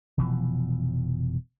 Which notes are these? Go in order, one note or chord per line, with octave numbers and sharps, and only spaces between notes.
F1 B2 E3 F3